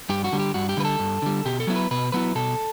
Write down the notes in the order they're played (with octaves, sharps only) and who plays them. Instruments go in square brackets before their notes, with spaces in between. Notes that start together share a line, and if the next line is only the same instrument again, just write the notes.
[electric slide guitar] G2 G4
F#4
D3 G3
G4
G2 F#4
G4
D3 G3 B4
A4
G2
D3 G3
B2 G4
A4
F#3 B3 E4
B4
B2 B4
F#3 B3 E4 B4
B2 A4